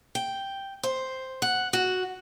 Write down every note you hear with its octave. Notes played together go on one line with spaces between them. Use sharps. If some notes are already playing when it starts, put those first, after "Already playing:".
G5
C5
F#5
F#4